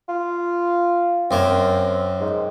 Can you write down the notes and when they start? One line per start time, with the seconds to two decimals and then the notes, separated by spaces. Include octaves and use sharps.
0.09 F4
1.31 F#2 A#3 C4
2.20 G#2